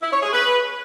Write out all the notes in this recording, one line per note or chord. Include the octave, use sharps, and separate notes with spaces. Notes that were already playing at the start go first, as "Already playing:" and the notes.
E4
C#5
G#4
B4